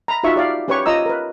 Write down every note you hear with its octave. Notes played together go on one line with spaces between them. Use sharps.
A#5 B5
D#4 F4 F#4 E5 C#6
G4 D5 F5
C#4 G4 B4 C#5 C#6
F4 D#5 A#5 E6
A#4 B4